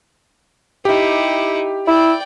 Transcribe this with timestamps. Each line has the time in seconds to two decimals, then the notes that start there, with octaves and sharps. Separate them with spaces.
0.85 D#4 E4 G4
1.88 E4 D5 G5